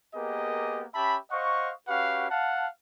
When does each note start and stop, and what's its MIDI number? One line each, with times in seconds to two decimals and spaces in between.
0.15 0.84 58
0.15 0.84 59
0.15 0.84 67
0.15 0.84 68
0.15 0.84 70
0.15 0.84 75
0.95 1.17 61
0.95 1.17 67
0.95 1.17 76
0.95 1.17 81
0.95 1.17 83
1.31 1.72 72
1.31 1.72 75
1.31 1.72 77
1.31 1.72 78
1.31 1.72 85
1.88 2.29 61
1.88 2.29 66
1.88 2.29 67
1.88 2.29 71
1.88 2.29 77
1.88 2.29 78
2.31 2.67 77
2.31 2.67 78
2.31 2.67 81